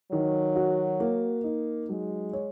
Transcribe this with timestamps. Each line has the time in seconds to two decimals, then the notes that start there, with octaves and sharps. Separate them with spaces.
0.11 D#3 F#3
0.56 F#4
1.00 A#3
1.44 D#4
1.89 F#3 G#3
2.33 C#5